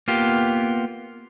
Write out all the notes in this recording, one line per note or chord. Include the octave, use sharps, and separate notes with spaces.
A#3 B3 F4 G4